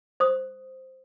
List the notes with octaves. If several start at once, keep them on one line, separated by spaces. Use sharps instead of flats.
C5 D#6